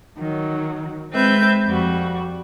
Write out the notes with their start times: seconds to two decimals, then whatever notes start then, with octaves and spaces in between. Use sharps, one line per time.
0.17 D#3 F#3
1.11 G#3 C4 B4 E5 G6
1.66 F2 G3 F#4